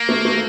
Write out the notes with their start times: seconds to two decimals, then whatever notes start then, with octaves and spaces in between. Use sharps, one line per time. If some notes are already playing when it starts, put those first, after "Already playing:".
Already playing: A#3
0.09 A3
0.25 A3